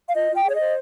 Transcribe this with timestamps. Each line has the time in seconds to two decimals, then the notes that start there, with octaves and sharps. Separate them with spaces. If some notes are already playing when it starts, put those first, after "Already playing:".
0.09 F5
0.14 F4 D#5
0.31 F4 G5
0.45 G#4
0.50 C#5
0.55 C5 D#5